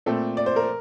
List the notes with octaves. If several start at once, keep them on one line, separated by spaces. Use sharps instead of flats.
A#2 A3 C4 A4
D5
C5
A#4